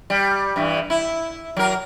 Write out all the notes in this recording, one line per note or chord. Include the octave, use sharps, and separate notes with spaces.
G3
G2 E3
E4
F#3 A#4